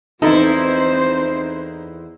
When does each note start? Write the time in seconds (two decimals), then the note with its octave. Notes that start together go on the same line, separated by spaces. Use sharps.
0.22 E2 C4 D#4 E4 A4 C5